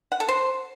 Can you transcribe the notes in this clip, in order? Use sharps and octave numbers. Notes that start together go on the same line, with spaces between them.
F#5
A4
C5